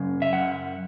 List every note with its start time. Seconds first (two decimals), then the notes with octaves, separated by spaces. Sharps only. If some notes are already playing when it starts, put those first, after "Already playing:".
Already playing: F#2 C#3
0.22 E5
0.32 F#2 F#5